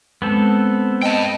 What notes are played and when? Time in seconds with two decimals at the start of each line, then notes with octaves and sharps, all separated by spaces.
0.22 G#3 B3 C4 A4
1.03 D#5 G5 A5